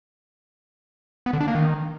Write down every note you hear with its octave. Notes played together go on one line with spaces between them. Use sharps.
B3
D3
D4
A#3
D#3